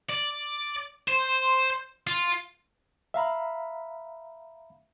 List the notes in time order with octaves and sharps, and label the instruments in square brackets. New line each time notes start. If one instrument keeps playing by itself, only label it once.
[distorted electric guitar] D5
C5
F4
[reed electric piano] E5 F5 A#5 B5